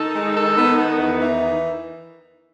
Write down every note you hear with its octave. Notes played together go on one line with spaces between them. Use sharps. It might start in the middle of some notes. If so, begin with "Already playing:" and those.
Already playing: D#3 D#4 A4
G#3
A4
B3
B3
E2
E3